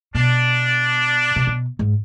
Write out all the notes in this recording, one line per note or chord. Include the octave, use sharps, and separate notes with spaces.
B2 D4
C3
B2
G#2